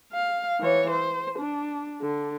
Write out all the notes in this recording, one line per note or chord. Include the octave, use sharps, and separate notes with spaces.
F5
E3 C#5
C5
D4
D3